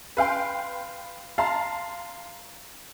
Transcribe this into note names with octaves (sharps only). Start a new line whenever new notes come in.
B4 F5 G5 C6
F5 A5 A#5 C6